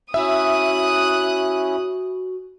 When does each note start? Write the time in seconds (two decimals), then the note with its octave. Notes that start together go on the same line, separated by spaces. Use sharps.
0.14 C#4 E4 F#4 E5 D#6 F#6